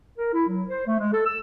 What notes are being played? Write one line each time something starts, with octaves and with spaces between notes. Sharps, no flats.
A#4
E4
F#3
C5
A3
G#3
A4
E6